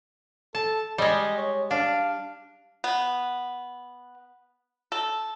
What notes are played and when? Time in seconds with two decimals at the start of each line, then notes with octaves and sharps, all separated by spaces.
0.55 A4 A5
0.98 G3 G#3 D#5
1.37 C#5
1.71 D4 F5
2.84 B3
4.92 A4